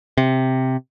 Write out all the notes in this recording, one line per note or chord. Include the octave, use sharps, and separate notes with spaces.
C3